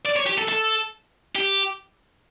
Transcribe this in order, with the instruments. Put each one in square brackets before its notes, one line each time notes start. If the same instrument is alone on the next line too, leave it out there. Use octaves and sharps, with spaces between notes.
[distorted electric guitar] D5
C#5
G4
A4
A4
G4